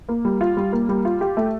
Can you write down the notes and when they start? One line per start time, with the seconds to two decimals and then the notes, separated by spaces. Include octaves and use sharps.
0.09 A#3
0.25 G3
0.41 F4
0.57 G3
0.73 A#3
0.89 G3
1.05 F4
1.21 G4
1.37 A3